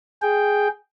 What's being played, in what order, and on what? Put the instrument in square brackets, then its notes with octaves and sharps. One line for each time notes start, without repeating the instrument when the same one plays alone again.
[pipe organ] G#4 G5